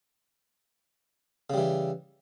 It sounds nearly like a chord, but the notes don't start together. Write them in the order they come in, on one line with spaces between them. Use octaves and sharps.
C#3 G3 E3